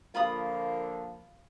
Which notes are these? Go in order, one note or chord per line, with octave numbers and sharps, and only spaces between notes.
A#2 D3 F3 A#3 F4 B5 D#6